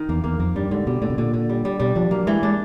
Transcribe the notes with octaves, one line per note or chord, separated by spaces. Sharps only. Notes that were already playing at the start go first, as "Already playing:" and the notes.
Already playing: D#3
E2 A#3
E2 A#3
F2 A#3
G2 G3
G#2 D3
B2 G3
A2 D3
B2
A#2 D3
D3
G3
G3
B2 G3
F3 D4
F#3 A#3
E3 G#3
G#3 D4